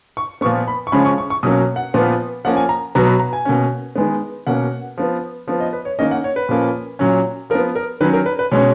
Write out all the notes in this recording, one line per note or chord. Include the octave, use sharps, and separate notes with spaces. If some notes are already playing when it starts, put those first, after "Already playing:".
C#6
A#2 F3 B3 C#6
B5
C#6
C#3 F3 G#3 C#4 B5
C#6
C#6
C#6
B2 F#3 A#3 C#4 D#6
F#5
A#2 F3 B3
F3 A#3 C#4 F#5
G#5
A#5
B2 F#3 B3 A#5
B5
A#5
G#5
B2 A#3 C#4
D#3 G#3 B3
B2 A#3 C#4 F#5
F3 B3
F3 B3
D#5
B4
C#5
D#3 A#3 C#4 D#5
F#5
C#5
B4
A#2 F3 A#3 C#4
A#2 F#3 C#4
F3 A#4
B3
A#4
D#3 F#3 C#4 B4
A#4
B4
B4
B2 G#3 C#4 C#5